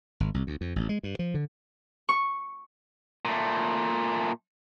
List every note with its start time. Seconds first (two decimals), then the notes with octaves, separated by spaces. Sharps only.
0.20 G#1
0.34 C2
0.47 D2
0.61 F2
0.76 A1
0.89 G#3
1.03 G2
1.19 F3
1.34 D3
2.09 C#6
3.25 A#2 A3